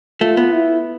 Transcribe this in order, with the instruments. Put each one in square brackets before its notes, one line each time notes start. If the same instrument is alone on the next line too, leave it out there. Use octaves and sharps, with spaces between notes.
[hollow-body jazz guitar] A3 [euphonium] F4
[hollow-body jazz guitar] B3
[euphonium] E4